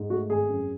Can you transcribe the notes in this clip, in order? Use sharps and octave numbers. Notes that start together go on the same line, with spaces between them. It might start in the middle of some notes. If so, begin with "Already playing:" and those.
Already playing: G#2
A3 F#4
G#1 G#4
F#2